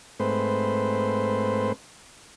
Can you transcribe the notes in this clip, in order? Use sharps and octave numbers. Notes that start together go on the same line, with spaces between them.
G#2 A3 C4 B4 C5